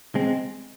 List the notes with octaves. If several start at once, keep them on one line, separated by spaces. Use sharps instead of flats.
G#3 C4